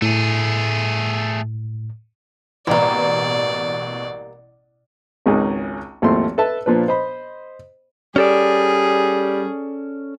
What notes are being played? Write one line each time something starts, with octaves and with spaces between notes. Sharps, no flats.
A2 A3 G#4
A1 B2 G3 A#3 D5
G#1 C#2 D#4 G#4
G#1 D#2 F3 A3 E4 C6
A4 B4 E5 A5
A#2 F3 D4 B4
C5 D#5 B5
G3 C#4 G#4 A4 D5